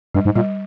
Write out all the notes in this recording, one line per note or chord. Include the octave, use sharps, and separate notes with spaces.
G2 G3
G#2
A#2 G3